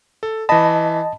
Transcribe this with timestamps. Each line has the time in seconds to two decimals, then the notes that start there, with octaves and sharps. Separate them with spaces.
0.23 A4
0.49 E3 D#5 A5 B5